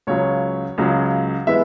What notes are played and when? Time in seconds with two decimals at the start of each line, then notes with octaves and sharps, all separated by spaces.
0.07 C#2 C#3 F#3 C#5
0.78 C#2 C#3 F#3
1.47 E3 G#3 B3 E5